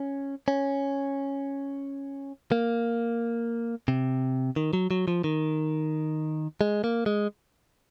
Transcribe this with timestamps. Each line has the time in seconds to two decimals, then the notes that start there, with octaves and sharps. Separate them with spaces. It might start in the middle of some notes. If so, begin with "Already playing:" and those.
Already playing: C#4
0.48 C#4
2.52 A#3
3.88 C3
4.56 D#3
4.73 F#3
4.91 F#3
5.08 F3
5.24 D#3
6.61 G#3
6.84 A#3
7.06 G#3